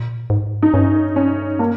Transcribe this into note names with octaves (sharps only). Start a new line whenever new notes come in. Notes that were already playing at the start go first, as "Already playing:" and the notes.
Already playing: A#2
G#2
D#4
G2 C#4
C#4
A#3